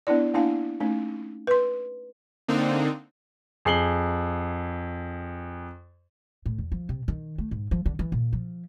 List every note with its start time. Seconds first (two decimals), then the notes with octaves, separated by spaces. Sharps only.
0.07 B3 D4 E4 D5
0.34 A#3 D4 E4 F5 G#5
0.80 A3 C#4 D#4
1.47 B4 C6
2.48 D3 A#3 C4 D4 D#4
3.65 F2 G#4 C7 F#7 G7
6.46 A2
6.58 E2
6.72 F3
6.89 C3
7.08 D#3
7.38 A3
7.51 G#2
7.71 F3
7.86 D3
7.99 E3
8.12 A#2
8.33 F3